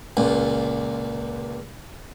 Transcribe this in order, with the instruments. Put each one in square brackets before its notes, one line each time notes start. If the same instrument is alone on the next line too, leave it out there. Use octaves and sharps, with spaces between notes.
[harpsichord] C#2 A#2